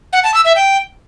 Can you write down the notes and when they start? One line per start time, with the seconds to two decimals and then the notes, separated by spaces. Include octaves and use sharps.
0.13 F#5
0.23 A5
0.34 E6
0.45 E5
0.56 G5